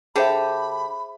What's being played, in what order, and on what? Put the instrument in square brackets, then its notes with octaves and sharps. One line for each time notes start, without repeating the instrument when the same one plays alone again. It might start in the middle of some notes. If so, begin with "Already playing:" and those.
[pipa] D3 G4 [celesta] G#4 C5 E5 [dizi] B5